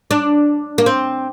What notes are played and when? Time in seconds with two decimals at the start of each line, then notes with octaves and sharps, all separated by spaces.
0.11 D4
0.78 A#3
0.86 C4